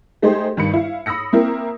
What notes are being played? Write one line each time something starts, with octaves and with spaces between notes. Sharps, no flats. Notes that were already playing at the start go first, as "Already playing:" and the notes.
G#3 A3 D#4 G4 G#4 C5
G2 D#3 B5 C#7
E4 F5
B5 D#6 E6 A#6 C#7
A#3 C4 E4 A#4